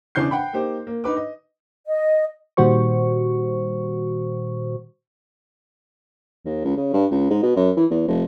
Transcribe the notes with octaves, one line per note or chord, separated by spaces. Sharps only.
E2 C#3 E3 D4 G6 C7
F#5 G5 B5
A#3 D#4 G4 C5
A#3
D#4 B4 D6
D#5
D#5
A#2 D#3 G3 F#4 C5 C#6
D#2
C#2
C#3
G2
C#2
G#2
B2
F#2
E3
E2
F1